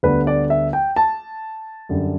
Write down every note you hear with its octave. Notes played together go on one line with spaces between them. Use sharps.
D2 D3 G3 B3 B4
D5
E5
G5
A5
F#2 D3 G3